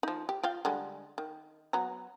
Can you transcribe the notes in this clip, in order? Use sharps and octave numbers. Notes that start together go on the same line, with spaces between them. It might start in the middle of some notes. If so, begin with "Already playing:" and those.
F3 D#4
G4
F4 F5 G5
D3 G3 G#3
D#3
F#3 B3 A#5